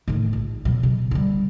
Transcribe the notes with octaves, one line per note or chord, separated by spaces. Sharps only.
A2 D#3
A#1
B2 F#3
B2
D3 G3